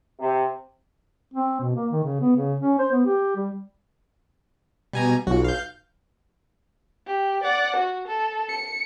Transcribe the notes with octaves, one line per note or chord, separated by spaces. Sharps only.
C3
C4
B2
A#3
D#3
C#3
B3
C#3
C#4
C5
B3
G4
G3
B2 G3 G#5 A#5
B1 F#3 F4 F#4
F5 G6
G4
D5 F#5
F#4
A4
C#7